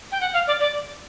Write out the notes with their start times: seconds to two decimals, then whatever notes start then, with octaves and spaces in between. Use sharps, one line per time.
0.12 G5
0.21 F#5
0.34 F5
0.47 D5
0.61 D5